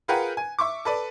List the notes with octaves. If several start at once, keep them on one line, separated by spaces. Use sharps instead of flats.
F4 G#4 A#4 B4 F#5 G5
G#5
E5 C#6 D6
A4 B4 D5